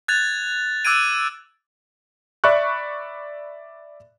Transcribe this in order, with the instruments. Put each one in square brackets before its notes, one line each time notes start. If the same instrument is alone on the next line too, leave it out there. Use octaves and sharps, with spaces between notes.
[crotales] F#6 G#6 A6 F7
D6 E6 F#6 G#6 D7 D#7
[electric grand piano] D5 E5 B5 C#6 F#6